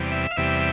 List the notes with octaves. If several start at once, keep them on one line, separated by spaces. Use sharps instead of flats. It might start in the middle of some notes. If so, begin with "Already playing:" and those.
Already playing: E2 C3 G3
E5
F5
E2 C3 G3 E5